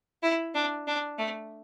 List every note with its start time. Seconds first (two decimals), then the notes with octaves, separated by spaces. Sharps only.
0.23 E4
0.55 D4
0.87 D4
1.19 A3